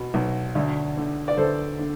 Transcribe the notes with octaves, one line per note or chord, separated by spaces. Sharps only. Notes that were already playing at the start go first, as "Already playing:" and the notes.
Already playing: B2
B1
D2
D3
D5
D2 A4 C5
D3